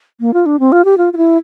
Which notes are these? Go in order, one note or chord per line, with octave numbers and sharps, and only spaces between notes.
A#3
F4
D4
C4
F4
G4
F4
F4
E4